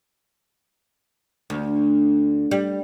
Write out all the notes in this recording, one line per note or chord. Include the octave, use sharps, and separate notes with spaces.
D2
G3